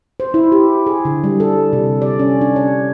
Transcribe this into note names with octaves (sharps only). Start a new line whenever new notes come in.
C5
E4
G4
G#4
D3
G3
A4
C3
D5
C#4
D4
C#5